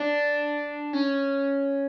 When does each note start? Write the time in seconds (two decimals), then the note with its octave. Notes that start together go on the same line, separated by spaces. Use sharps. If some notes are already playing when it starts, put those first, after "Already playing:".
Already playing: D4
0.93 C#4